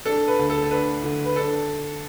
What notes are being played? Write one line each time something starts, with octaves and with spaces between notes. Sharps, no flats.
D4 A4
B4
D2
A4
A4
D4 B4
D3
B4
D4 A4